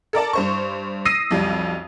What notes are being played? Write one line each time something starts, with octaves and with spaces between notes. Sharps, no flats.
A4 A#4 D5 A5
G2 C5 C#6
D#6 E6 A#6 C7 D#7
B1 F2 G3